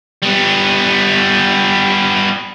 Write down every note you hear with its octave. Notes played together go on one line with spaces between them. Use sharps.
G3 B3